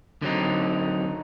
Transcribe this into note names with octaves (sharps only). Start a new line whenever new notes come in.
D3 F#3 C4 D#4